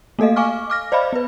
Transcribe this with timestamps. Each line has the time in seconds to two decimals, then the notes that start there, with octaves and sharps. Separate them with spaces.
0.19 A3 A#3 A4 D#5 F5
0.36 F5 G#5 C#6 D6 F6
0.70 D6 F6 A#6
0.92 C5 D5 D#5 F5 B5
1.13 B3 B4